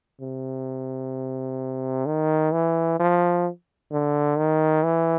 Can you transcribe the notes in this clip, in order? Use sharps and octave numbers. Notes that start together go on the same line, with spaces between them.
C3
D#3
E3
F3
D3
D#3
E3